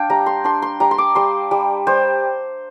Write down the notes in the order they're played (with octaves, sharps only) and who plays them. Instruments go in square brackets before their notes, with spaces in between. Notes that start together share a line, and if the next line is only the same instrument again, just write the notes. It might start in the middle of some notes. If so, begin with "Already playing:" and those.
Already playing: [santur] D4 F5 G5
G3 A#5
C6
D4 C6
C6
G3 A#5
C6
D6
G3 C6
G3
G3 C5